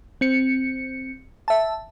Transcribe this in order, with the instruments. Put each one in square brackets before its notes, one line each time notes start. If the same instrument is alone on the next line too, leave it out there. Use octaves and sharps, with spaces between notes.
[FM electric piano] C4 C#7
E5 A5